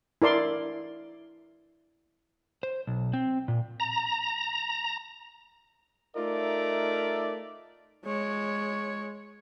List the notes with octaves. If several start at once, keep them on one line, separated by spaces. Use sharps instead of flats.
E4 A#4 D5 C6
C5
B1
C4
A#2
A#5
A3 D#4 F4 A#4 D5 E5
G#3 C#5